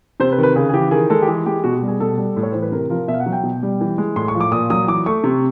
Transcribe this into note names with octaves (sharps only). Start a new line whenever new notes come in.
C3 C5
B4
D#3
B4
C#3 G#4
G#4
E3 G4
D#3 G#4
G#3 A4
G4
E3 G#4
G#3 G4
B2 F#4
G4
G3
G#4
B2 A4
G3
A2
C#5
E3 C5
B4
C3 A#4
F3 A#4
B2 E5
F5
F#5
F#3
G5
B2
G3
E3
G#3
A2 C6
C#6
F3
D6
A#2 D#6
F#3 D#6
E3 D6
A3 C#6
C3